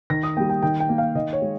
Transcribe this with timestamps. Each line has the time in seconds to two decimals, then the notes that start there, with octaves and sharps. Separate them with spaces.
0.10 D#3 A#6
0.23 D#6
0.37 G3 A#3 G5
0.49 G5
0.62 D#3 G5
0.80 G5
0.89 A#3
0.98 F5
1.15 D#3 D#5
1.33 C#5
1.42 G#3